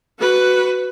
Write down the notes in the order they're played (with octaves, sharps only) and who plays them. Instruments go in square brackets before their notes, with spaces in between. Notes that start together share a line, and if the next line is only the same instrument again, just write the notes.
[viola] F#4 B4